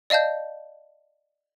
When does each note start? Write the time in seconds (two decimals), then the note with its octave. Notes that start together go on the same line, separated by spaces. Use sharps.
0.10 D5 D#5 F5 A5 G6